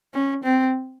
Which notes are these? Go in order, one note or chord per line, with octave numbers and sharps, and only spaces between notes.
C#4
C4